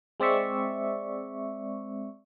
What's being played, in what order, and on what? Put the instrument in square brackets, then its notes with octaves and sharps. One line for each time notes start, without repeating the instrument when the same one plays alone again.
[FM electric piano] G#3 C4 D5 E5 C#6